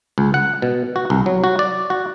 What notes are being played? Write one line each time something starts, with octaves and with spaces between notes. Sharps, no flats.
C#2
F#5
B2
F#4
C2
F#3
F#4
D5
F#4